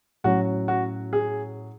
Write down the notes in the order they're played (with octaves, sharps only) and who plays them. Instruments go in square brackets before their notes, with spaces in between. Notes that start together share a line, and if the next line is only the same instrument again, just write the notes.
[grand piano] A2 F#3 C#4 [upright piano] F#4
[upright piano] F#4
G#4